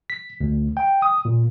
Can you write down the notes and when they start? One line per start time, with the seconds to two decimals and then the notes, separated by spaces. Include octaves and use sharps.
0.10 B6
0.41 D2
0.77 G5
1.02 D#6
1.25 A#2